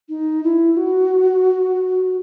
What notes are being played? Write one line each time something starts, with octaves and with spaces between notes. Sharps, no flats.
D#4
E4
F#4